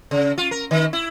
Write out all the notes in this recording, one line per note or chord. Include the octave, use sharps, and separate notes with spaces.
C#3
F4
A#4
D#3
E4